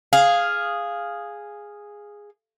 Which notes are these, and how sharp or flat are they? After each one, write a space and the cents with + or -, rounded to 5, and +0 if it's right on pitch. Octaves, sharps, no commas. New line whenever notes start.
G#4 -5 F5 +0